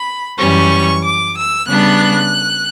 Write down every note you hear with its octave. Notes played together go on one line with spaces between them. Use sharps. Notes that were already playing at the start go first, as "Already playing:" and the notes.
Already playing: B5
F#2 E3 G3 C#4 C#6
D6
E6
C#3 G3 B3 D4 F#6